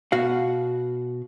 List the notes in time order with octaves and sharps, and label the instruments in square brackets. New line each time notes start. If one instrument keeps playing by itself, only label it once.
[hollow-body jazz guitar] B2 F#4 F5